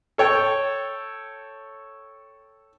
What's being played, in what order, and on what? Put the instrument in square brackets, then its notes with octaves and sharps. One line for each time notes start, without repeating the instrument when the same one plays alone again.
[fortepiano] A4 C#5 G5